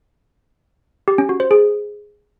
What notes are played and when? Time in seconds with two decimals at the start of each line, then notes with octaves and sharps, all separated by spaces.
1.08 G4
1.18 C#4
1.29 F#4
1.40 C5
1.51 G#4